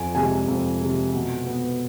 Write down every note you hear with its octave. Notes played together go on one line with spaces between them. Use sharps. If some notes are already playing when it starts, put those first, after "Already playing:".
Already playing: F2 G#5
C3 G#3 G#5
F2
C3 G#3
B2
B3